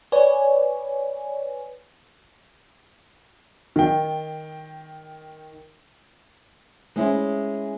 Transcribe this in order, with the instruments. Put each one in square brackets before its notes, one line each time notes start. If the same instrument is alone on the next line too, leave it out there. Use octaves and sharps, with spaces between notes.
[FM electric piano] B4 C#5 D5 G#5
[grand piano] D#3 G5
[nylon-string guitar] G#3 C4 C#4 E4